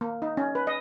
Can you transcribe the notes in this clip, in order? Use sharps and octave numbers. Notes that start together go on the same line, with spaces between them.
A#3
D#4
C#4
B4
D#5